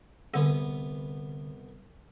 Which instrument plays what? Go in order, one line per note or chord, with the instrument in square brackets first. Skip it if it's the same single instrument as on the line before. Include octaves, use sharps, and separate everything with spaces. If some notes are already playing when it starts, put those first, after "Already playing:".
[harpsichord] C2 B3 G#4 [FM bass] D3